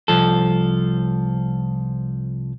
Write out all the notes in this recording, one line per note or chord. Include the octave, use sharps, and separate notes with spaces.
C2 F3 A4